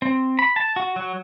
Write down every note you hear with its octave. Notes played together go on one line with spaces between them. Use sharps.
C4
B5
A5
F#4
F#3